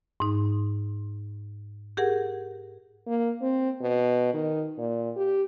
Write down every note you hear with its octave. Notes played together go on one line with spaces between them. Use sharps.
G#2 D#4
G4 G#4 A#4 F#5
A#3
C4
B2
D#3
A#2
G4